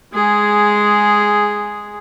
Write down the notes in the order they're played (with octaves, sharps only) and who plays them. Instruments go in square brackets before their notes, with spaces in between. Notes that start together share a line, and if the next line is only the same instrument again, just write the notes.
[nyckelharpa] G#3 G#4